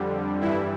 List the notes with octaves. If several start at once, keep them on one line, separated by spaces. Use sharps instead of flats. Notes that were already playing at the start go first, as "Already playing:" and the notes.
Already playing: F2 D3 G3
G2 E3 G3 E4